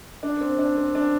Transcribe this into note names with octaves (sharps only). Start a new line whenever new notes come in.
D4
C4
D4
C4
D4